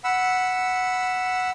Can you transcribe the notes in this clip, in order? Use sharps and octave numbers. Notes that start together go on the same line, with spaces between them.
F#5 B5 E6